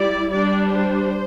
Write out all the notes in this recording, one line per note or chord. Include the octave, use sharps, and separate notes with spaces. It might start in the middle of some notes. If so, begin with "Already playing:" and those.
Already playing: G3 E4 D5
G3 D4 D5
C5